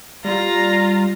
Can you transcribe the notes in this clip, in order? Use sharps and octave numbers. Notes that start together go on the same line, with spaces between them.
G3 F4 A#5